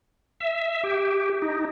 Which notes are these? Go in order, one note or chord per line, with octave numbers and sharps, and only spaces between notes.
E5
G4
D#4